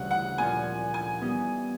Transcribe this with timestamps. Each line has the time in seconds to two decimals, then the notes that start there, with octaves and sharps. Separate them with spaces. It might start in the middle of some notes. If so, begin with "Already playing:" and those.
Already playing: D2 C#3 E3 G3 F#5
0.11 F#5
0.38 A#2 F3 A#3 D4 G#5
0.94 G#5
1.21 E3 G3 B3 D#4